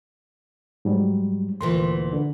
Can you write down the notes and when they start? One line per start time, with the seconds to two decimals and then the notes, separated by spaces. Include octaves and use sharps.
0.85 G#2 F#3 G3
1.61 D2 A#2 E3 C6
2.13 D3